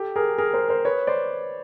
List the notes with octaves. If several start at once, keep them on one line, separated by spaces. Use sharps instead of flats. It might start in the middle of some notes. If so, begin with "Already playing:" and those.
Already playing: G4 A4
G#4 A#4
G#4 A#4
A#4 C5
A#4 C5
B4 C#5
C5 D5